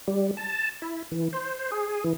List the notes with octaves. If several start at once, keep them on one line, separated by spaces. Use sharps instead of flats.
G3
A5
E4
E3
C5
G#4
E3